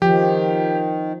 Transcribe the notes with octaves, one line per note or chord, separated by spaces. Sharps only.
D#3 F3 G4